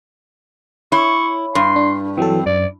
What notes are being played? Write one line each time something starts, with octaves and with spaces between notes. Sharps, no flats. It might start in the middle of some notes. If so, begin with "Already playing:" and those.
E4 C#5 C#6
G2 C6
D4
E3 F#3 C4 A4
F#2 D5